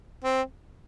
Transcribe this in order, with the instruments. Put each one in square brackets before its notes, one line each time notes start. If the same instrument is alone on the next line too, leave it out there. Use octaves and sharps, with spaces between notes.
[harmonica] C4